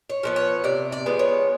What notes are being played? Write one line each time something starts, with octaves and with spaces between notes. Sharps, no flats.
C#5
F3 G#3 B3
C#5
C3 D5
D5
F3 G#3 B3
C#5